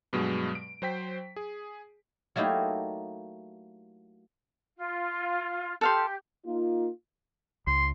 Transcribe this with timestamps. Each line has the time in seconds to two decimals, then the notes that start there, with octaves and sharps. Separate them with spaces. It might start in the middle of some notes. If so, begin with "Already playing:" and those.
0.13 G2 B2 F#3 G#3
0.55 D7
0.82 F#3 C5 G5 B6
1.36 G#4
2.36 F#3 A3 A#3 D#4 E4 G4
4.78 F4
5.81 G4 A4 F5 C6
6.46 A#3 D#4 F4
7.67 C#2 C6